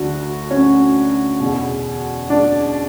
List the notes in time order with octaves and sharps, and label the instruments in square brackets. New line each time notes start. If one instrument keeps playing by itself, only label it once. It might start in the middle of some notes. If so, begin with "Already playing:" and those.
Already playing: [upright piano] D2 D3 F#4
C#4
E2 B2
D4